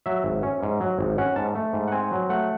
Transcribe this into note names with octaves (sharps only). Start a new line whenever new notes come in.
F#3 E5
G#1
C#4
G#2
F#3
G#1
C#4 F#5
G#2 A5
A3
G#2
F#5
C4 G#5
F#3
A3 F#5